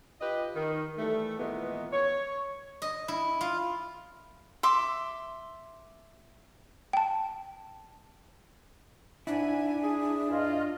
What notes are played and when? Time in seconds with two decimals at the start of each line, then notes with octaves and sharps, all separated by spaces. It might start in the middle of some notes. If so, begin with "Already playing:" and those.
0.21 F4 G4 B4 D#5
0.56 D#3
0.98 E3 G3 A3
1.39 A#2 D#3 E3 G#3 B3
1.93 C#5
2.82 D#5
3.08 E4
3.41 F4
4.63 E5 C6 D6
6.93 G5 A5
9.27 G#2 D4 E4 G#5
9.83 G#4
10.30 G2 F4 D#5